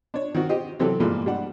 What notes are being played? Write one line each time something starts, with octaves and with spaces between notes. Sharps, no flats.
D4 C#5
D#3 C4 F#4
G4 C5 D#5
C3 E3 F#3 C4 G4 A4
G2 A#2 E3 F3 G#3 A#3
G3 D4 F#5